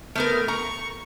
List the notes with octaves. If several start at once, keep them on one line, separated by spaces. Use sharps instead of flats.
A3 B3 A#4 F6
A#5 C#6